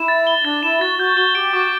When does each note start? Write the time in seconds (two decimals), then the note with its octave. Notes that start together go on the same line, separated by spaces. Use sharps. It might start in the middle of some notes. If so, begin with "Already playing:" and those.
Already playing: E4 E7
0.08 A6
0.27 G7
0.45 D4 A6
0.63 E4 E7
0.80 F#4 A6
0.99 F#4 G6
1.17 F#4 G7
1.35 G4 D7
1.53 F#4 D6